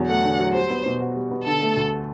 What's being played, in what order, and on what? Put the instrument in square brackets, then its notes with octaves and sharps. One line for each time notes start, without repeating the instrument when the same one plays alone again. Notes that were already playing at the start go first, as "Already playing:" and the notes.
Already playing: [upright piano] E2 D3 F#3
[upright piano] A3 [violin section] F#5
[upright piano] D3
F#3
[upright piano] G3 [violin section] C5
[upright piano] B3
B2
F#4
G3
B3
[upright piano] D3 [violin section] A4
[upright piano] A3
D2